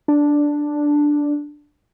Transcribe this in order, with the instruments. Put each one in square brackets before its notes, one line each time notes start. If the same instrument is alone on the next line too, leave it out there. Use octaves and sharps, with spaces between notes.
[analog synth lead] D4